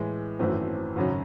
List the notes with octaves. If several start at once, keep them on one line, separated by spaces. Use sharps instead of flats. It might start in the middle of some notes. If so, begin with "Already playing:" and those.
Already playing: A2 E3 G#3
G#1 F#2 E3 A3 C4
G#1 F#2 C#3 F#3 C#4